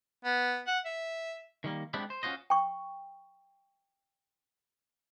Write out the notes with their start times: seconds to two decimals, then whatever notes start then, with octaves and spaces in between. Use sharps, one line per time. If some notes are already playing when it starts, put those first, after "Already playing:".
0.25 B3
0.67 F#5
0.86 E5
1.64 D#3 G3 A#3
1.94 G#3 B3 C4 D4 E4 G4
2.10 C5
2.23 C#4 F4 F#4 C5 D#5
2.50 G5 C#6